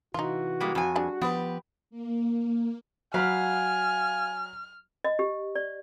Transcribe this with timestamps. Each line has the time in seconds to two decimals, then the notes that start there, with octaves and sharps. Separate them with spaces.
0.14 C3 E3 D#4 F4 F#4
0.60 G3 G#3 A#3
0.75 F2 G#5
0.96 G3 D4 G#4
1.22 F3 B3 G4 B4
1.90 A#3
3.14 F#3 F5 F#5 G#5 B5 F6
5.04 D#5
5.19 G4
5.55 D5